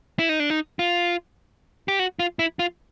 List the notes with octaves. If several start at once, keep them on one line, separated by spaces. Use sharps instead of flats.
E4
D#4
D4
D#4
F4
G4
F#4
F4
E4
F4